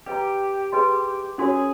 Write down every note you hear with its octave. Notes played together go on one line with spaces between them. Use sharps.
G4 B4 D#5 G5 A#5
G#4 B4 D#5 G#5 C6
C#4 F#4 G#4 A#4 C#5